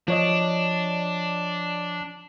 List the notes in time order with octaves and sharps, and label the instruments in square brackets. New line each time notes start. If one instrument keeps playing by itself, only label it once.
[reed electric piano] F3 C#5 D#5 [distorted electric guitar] D4